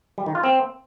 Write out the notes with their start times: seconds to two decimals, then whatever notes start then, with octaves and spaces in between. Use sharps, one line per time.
0.18 G3
0.26 D#3
0.35 F4
0.44 C4